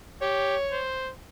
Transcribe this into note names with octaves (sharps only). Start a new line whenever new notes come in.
G4 C#5
C5